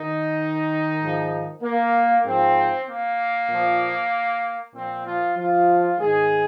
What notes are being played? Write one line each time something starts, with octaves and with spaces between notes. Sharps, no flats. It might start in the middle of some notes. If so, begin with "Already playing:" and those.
Already playing: D#3 D#4
G#2 F3
A#3
G#2 F3 C4
A#3
A#2 F3
A#2 F3 C4
F3 F4
F3 F4
G#2 D#3 G#3 G#4